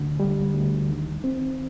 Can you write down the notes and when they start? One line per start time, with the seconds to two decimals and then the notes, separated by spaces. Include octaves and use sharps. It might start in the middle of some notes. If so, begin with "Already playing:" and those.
Already playing: D2 D3
0.20 G3
0.54 D2
0.89 D#3
1.24 C4